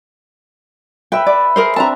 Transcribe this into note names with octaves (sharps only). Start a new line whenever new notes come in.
B4 E5 G5 B5
D5
G#4 A#4 C5
C4 D4 E5 A5 A#5